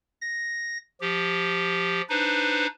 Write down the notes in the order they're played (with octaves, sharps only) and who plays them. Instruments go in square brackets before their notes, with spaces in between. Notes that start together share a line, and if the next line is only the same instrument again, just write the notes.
[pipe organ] A#6
F3 G4
D4 D#4 B4 C5